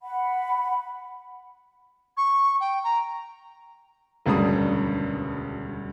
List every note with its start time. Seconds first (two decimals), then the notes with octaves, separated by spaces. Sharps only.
0.02 F#5 B5
2.17 C#6
2.60 G5
2.84 A#5
4.26 E1 D2 G2 C#3 D4 D#6